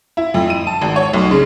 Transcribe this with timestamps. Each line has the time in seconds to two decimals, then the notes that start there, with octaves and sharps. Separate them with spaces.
0.17 E4
0.34 F2
0.50 D#7
0.67 A5
0.82 G#1
0.96 C#5
1.13 B1
1.31 C#3